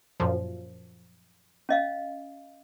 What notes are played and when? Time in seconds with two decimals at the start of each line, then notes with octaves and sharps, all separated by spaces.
0.20 F#2 A#2 F3
1.69 C#4 D#5 F5